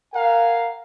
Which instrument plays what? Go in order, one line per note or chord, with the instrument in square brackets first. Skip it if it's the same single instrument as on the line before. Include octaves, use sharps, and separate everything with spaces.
[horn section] A#4 F5 F#5 G#5 A#5